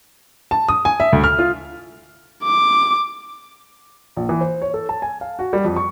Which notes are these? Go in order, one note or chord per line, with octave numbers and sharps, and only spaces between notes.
A5
D#6
G#5
E5
D2
F6
F4
D6
A#1
E3
C5
C#5
A4
A5
G#5
F5
F#4
G3
F2
C#6